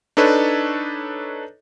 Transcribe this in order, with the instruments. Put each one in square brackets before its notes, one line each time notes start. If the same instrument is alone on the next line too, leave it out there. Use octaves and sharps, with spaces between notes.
[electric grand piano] D4 D#4 A4 B4 C#5